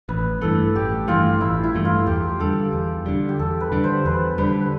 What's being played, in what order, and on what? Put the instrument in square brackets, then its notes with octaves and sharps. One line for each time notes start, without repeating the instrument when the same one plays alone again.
[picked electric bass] A1 [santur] B4
[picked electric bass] G2 E3 A3 [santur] A4
[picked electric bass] A1 [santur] G4
[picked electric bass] G2 E3 A3 [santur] F4
[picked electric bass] A1 [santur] E4
[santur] E4
[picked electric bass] G2 E3 A3
[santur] F4
[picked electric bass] E2 [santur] G4
[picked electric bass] D3 G3 [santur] A4
[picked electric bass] E2
D3 G3
[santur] G4
[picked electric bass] E2 [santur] A4
[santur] B4
[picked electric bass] D3 G3
[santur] C5
[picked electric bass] E2 [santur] B4
[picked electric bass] D3 G3 [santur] B4